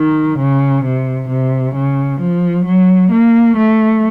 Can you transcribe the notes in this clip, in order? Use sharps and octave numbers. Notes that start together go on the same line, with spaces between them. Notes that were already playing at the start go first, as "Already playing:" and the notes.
Already playing: D#3
C#3
C3
C3
C#3
F3
F#3
A#3
A3